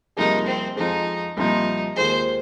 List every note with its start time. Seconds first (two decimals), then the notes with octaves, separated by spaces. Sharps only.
0.17 C2 C3 F3 A#3 D#4 G#4
0.46 C4
0.76 F2 F3 G#3 D#4
1.37 C2 A#2 F3 C4 D#4 F4
1.96 D#2 D#3 G#3 F4 G#4 C5